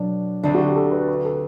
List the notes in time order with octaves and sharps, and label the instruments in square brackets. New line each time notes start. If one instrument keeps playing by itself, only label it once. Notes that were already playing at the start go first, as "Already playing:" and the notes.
Already playing: [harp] B2 F#3 A3 [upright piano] D4
[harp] D2 D3 A3 C4 [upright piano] D4
[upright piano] F#4
G4
A4
B4
B4
A4